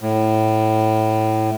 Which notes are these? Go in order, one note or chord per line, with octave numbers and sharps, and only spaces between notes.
A2